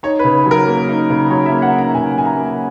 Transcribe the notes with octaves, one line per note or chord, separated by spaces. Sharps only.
D#4 C#5
B4
C#3
F#3 A#4
A#3
D#4
C#3
F#3 C#5
E5
A#3
F#5
D#4
A#5
C#3 G#5
F#3 G#5
A#5
A#3